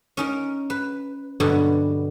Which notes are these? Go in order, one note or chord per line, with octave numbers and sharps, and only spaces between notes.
C#4 D#4 A#4
B4
G2 B2 D3 F#3 G3